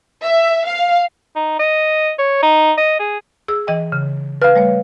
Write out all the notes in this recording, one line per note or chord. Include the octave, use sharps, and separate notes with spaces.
E5
F5
D#4
D#5
C#5
D#4
D#5
G#4
G#4 E6
E3 D#5 G5
C#3
B4 F5 F6
G3 A3 C#5